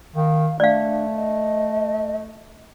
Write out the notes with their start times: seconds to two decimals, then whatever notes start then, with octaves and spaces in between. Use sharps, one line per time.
0.16 D#3 F5
0.60 A3 D4 D5 F5
1.16 D#5